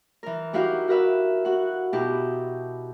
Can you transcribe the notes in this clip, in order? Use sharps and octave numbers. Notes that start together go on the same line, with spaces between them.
E3 A#4
D#4 E4 F#4 G4 F5
F#4 A#4 B4 E5
F#4 F#5
B2 D#4 E4 G4